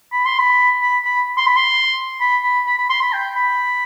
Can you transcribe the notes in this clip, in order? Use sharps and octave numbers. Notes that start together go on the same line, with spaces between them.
B5
C6
B5
B5
B5
C6
B5
C6
B5
B5
B5
B5
C6
B5
G5
B5